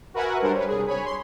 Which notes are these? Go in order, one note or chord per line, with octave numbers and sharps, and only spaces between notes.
F#4 A#4 B4 E5 F#5 G#5
G3 D4 A#4 C5
B4 C#5
C2 G#4
C#5 G#5 B5
C6